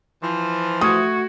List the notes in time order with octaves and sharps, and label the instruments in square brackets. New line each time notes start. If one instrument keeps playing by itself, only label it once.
[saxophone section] E3 F3
[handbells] A3 C#6 G#6 [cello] F#4 [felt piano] D#6